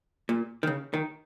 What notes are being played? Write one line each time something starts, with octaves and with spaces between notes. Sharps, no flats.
A#2
D#3
C#3
D#3